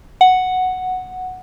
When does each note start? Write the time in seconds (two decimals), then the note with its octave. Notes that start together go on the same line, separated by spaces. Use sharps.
0.21 F#5